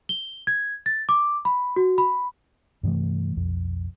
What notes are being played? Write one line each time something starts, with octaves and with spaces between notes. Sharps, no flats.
G7
G#6
A6
D6
B5
F#4
B5
G2 C3 E3 A3
B1 F2